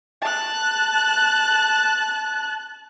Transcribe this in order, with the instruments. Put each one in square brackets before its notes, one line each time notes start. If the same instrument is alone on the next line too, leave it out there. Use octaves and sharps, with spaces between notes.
[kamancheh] A5 F#6